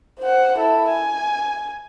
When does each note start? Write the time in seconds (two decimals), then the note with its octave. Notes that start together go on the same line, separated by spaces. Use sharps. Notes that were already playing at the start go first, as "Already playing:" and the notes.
0.19 C5 F#5
0.58 E4 A4
0.88 G#5